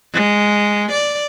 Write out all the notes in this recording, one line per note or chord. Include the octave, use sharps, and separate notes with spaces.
G#3
D5